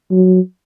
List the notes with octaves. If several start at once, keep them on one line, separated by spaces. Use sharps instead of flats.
F#3